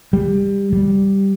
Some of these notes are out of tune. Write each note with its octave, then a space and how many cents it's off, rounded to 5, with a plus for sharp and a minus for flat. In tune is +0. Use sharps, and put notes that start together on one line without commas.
G3 +20
G3 +0